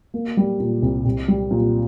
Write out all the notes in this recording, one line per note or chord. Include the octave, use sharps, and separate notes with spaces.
A#3
G3
A#2
C2
C2
G3
A#2